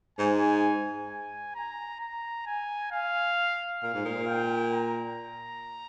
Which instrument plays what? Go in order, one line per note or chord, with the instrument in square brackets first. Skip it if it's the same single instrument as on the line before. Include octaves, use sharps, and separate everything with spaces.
[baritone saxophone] G#2 [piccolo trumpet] G#5
[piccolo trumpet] G#5
A#5
A#5
G#5
F5
[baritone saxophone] A#2 [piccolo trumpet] F5
[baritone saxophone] G#2
A#2
[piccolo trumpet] G5
A#5